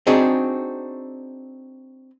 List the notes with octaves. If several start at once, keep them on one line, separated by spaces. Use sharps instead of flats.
C4 D4 D#4 F#4 G#4